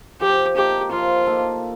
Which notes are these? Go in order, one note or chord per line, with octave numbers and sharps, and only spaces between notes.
F3 G4
A#3 D#4 G4 A4
F3 F4
A#3 D#4 A4